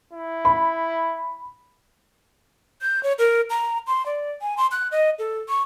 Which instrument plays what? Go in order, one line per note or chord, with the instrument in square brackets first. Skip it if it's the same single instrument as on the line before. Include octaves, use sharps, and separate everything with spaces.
[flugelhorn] E4
[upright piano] B5
[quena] G6
C#5
A#4
A#5
C6
D5
G#5
C6
F#6
D#5
A4
C#6